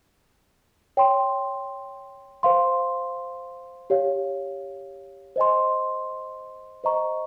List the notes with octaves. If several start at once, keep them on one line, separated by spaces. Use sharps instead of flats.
C#5 G5 C6
C5 F5 C6
G4 C#5 F5
C5 D#5 G#5 C6
C5 D#5 A#5 C#6